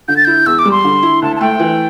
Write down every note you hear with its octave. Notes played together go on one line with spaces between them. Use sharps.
D3 G6
A6
E4 G6
E2 E6
D6
G3
C6
D3
E4
D2 A5
A5
A3 G5
E3